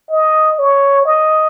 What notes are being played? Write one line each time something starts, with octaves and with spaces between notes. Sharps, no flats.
D#5
C#5
D#5